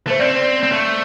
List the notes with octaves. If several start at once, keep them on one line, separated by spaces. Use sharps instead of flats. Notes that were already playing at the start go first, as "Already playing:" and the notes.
A3 C5
C4 D5
C4
A3